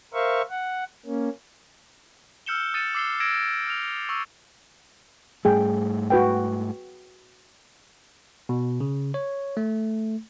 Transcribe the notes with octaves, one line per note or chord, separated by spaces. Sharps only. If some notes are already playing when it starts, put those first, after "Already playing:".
A#4 C5 E5 F5 C#6
F#5
A#3 C#4
E6 F6 G6 C#7 E7 G7
D#6 A6 C#7 D#7 E7
D6 E6 C7 C#7 G7
E6 G#6 A#6 D7 E7
F6 F7
C#6 E6
G#2 G3 A3 G#4 G5
F#4 B4 G5
B2
C#3
C#5
A3